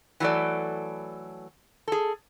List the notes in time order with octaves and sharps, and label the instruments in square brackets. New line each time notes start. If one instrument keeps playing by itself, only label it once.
[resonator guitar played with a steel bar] E3 F#3 A3 A4 D5
G#4 A4